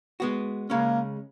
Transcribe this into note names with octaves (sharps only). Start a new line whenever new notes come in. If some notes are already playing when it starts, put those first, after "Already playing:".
G#3 B3 F#4
C#3 G#3 A#3 C#4